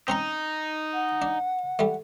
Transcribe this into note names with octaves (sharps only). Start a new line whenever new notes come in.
C4 C#4 D#4 A#5
F#5
D4
G3 A3